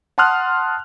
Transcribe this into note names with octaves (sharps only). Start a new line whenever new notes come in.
F#5 A5 C6 D#6 F6 F#6